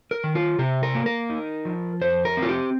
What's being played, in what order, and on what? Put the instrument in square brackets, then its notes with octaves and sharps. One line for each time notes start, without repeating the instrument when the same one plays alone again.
[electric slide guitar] A#4
D#3
F4
C3 G4
A#4
A#3
A#4
D#4
F3
F2 C5
A#4
C4
F4
G4